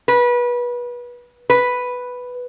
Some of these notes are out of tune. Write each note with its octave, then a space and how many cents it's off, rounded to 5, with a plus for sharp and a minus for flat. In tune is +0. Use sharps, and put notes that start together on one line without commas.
B4 -25
B4 +0